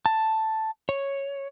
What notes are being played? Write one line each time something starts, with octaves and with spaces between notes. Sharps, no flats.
A5
C#5